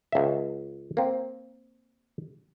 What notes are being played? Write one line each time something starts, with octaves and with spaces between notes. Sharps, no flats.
C#2 E5
A#3 C4